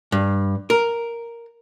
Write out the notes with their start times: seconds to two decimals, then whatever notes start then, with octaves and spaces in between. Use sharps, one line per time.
0.12 G2
0.70 A#4